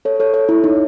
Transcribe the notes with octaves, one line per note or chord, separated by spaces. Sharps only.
A4 C#5
A4 C#5
A4 C#5
E4
D#4